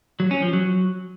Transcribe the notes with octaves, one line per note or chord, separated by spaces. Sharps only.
F#3
C#4
F3
F#3